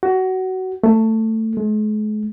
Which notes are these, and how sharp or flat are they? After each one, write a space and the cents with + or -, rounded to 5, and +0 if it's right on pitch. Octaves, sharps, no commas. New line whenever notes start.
F#4 +20
A3 +15
G#3 +45